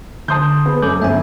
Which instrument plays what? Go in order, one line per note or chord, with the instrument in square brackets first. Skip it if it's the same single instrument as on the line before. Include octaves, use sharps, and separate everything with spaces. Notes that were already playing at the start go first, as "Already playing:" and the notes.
[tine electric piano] D3 D#6 [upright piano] A5 C6 G6
[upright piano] B3 G#4 B4
[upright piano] F#2 [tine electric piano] A4 D6 G6
[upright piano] G1 F#2 [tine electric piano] E5 G#5